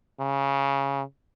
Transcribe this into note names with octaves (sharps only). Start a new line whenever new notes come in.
C#3